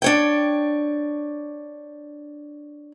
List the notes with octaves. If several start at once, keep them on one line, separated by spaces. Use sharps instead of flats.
D4 C#5 G5